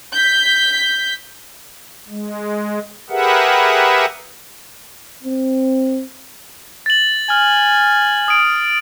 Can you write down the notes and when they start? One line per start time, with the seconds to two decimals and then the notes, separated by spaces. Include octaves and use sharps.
0.13 G6 B6
2.09 G#3
3.10 G4 G#4 A#4 B4 E5 F#5
5.23 C4
6.86 A6 F#7
7.30 G#5 F6
8.28 D#6 D7